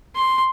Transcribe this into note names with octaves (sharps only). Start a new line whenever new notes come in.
C6